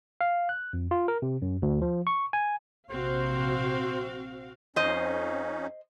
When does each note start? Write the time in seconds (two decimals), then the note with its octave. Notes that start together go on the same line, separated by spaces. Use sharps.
0.21 F5
0.49 F#6
0.73 F2
0.91 F4
1.08 A#4
1.22 C3
1.42 F#2
1.62 D2
1.82 F3
2.07 C#6
2.33 G#5
2.91 A#1 C3 C4 F#4 C5 F5
4.76 F2 C#4 D#4 C5 D#5